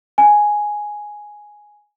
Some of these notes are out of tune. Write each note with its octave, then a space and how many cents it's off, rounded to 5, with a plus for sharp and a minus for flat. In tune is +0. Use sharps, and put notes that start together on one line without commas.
G#5 +0